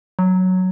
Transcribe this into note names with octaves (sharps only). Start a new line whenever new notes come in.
F#3